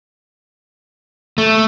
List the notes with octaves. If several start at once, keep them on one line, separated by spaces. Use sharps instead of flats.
A3